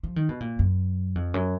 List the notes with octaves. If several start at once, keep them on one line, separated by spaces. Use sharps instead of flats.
F3
D#3
B2
A#2
F#2
F2
F#2